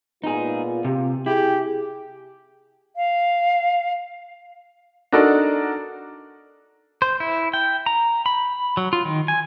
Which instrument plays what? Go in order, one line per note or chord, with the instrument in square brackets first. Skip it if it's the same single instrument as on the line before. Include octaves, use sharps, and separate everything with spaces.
[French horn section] A#2 B3 F4 [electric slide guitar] D#4 G#4
[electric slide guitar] C3 [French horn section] F4 G4
[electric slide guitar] E4 [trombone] G4 [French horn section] G#4
[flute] F5
[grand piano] D4 D#4 F#4 A4 A#4 D5
[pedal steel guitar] C5
E4
G5
A#5
B5
F#3
F4
D#3
G#5